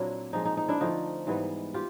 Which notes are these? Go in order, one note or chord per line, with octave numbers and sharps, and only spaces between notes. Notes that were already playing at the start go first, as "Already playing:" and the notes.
Already playing: A#2 F#3 A#3 C4 D4 E4
A#2 F3 G#3 D#4
D#4
D#4
D4 E4
D3 F3 A3 D#4 F4
G#2 E3 G3 B3
F4 G4